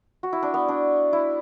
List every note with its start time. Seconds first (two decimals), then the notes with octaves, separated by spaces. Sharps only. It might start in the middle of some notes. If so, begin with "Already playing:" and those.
0.23 F#4
0.33 E4
0.43 D4
0.54 B3
0.68 D4
1.13 E4